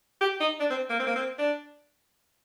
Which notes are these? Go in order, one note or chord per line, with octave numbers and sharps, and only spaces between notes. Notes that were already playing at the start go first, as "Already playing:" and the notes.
G4
D#4
D4
C4
A#3
C4
A#3
C4
D4